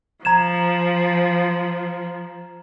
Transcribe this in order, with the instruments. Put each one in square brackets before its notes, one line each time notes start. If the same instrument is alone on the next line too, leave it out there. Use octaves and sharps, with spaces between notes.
[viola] F3 [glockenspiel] A#5 G#6 E7